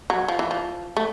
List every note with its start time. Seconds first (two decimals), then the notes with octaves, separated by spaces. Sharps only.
0.10 F#3
0.28 F3
0.39 E3
0.51 F3
0.97 A3